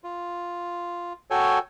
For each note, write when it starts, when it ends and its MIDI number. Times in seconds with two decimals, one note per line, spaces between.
0.04 1.13 65
1.31 1.59 66
1.31 1.59 69
1.31 1.59 73
1.31 1.59 79
1.31 1.59 80